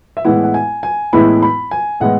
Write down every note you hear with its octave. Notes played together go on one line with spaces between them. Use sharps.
E5
A2 E3 G#3 B3 E4 F#5
F#5
G#5
G#5
A2 E3 G#3 B3 E4 B5
B5
G#5
A2 E3 G#3 B3 E4 F#5